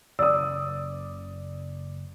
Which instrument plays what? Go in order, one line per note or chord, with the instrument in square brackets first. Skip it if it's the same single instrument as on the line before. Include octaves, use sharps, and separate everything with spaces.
[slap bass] F#1 C#3 [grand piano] D5 D#6 [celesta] E6